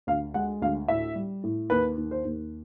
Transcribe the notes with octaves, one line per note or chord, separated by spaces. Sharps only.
D2 F5
G#3 F#5
D2 F5
A2 E5
G3
A2
D#2 B4
D#2
C5
D#2